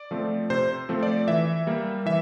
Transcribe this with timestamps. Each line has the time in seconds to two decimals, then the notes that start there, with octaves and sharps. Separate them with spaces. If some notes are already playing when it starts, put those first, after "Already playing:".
Already playing: D5
0.11 F3 A3 C4
0.50 C3 C5
0.89 F3 A3 C4
1.03 D5
1.28 E3 E5
1.67 G3 A#3
2.06 E3 E5